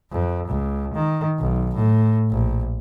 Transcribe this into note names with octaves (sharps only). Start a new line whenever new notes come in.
F2
C#2
D#3
B1
A2
A#1